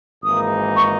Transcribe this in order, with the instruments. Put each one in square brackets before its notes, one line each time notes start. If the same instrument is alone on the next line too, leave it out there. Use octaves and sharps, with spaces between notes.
[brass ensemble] G#1 G#2 E3 A#3 D#4 [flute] D#6
[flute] C#6